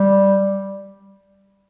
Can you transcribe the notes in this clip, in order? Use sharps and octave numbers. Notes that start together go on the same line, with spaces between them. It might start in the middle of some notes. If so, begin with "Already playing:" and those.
Already playing: G3